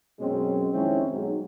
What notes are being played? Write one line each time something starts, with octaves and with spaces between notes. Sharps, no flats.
F#2 B2 F#3 G#3 C4 C#4
F2 D#3 G#3 C4 C#4 E4
B1 G#2 F#3